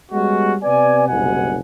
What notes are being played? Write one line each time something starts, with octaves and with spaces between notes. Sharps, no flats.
G3 G#3 B3 C#4 F#4
C3 B3 D5 G#5
F#1 C2 B2 F#5 G#5